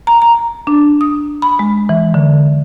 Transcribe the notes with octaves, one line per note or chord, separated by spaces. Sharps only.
A#5
A#5
D4
D#6
B5
G#3
E3
D3